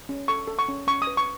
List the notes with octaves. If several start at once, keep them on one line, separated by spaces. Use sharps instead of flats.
C#4
A4 C#6
A4
C#6
C#4
C#4 C#6
D#6
B4
C#6